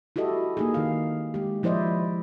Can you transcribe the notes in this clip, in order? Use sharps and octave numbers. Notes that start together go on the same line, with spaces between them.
E4 F#4 G4 A4 D#5
A#3 D#4 G#4
D#3 F5
G#3 G4
F3 E4 C5 D5 D#5